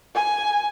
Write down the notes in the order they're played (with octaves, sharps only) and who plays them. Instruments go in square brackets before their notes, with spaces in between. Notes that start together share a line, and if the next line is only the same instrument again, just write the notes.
[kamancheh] G#5